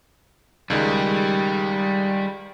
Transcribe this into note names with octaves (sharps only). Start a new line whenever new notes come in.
C#2 D#3 G3 G#3